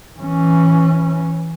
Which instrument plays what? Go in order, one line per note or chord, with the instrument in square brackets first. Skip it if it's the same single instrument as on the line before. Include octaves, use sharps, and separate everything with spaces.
[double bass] E3 C#4